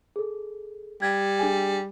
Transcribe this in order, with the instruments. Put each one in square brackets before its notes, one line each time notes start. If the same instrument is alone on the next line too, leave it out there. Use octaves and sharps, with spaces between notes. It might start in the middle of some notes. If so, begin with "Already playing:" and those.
[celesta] G#4 A4
[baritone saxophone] G3 [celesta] G#6
[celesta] D4 G#4 G#5